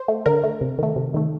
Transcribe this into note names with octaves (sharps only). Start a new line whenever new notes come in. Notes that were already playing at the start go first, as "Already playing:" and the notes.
Already playing: C5
A3
D3 A#4
A3
C3
D#3 A3
C3
D#3 A3